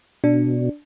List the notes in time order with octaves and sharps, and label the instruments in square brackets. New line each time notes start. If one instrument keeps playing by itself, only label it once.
[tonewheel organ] B2 [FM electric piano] D4